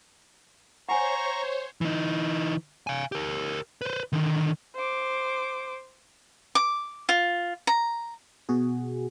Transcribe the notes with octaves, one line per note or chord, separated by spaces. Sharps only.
C5 C#5 F#5 G#5 A#5 C#6
E3 D#4
F5 G#5
G4 A#4
B4 C5
D3 D#3
C5 D6
D6
F4
A#5
B2 F#4 G#4